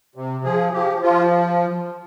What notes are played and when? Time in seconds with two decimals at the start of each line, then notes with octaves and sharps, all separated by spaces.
0.15 C3
0.44 F3 G#4
0.73 F3 G4
1.02 F3 F4